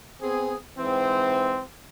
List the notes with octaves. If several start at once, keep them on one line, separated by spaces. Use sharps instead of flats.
B3 C4 G#4
G#2 E3 C4